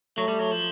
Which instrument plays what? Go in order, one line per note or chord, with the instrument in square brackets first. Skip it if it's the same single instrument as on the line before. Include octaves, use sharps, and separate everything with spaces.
[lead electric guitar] F#3 [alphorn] A3
[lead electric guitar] G3
F#3
F3